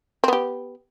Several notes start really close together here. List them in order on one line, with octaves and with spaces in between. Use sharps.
C4 B3 G4